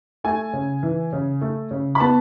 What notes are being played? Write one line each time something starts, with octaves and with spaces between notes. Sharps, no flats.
A3 G#5
C#3
E3
C#3
A3
C#3
B5
B3 A5